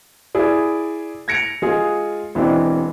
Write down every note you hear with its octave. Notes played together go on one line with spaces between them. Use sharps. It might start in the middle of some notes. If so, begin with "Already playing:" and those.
E4 G#4 D5
G#6 A#6 C#7 D7 F7
G#3 F4 G#4
E1 E3 C4 D4 D#5